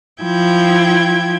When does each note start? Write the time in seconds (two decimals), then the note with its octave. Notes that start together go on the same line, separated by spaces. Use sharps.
0.22 F3 E4 G5 G#6